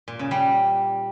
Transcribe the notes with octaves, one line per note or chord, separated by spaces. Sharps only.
A#2
C#3
G3